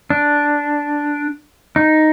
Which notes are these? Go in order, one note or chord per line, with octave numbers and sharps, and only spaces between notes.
D4
D#4